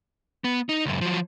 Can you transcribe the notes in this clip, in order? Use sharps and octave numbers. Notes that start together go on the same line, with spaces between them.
B3
D#4
C#2 F#2
F3 F#3